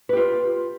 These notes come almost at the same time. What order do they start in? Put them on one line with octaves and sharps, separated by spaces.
B4 G4 F4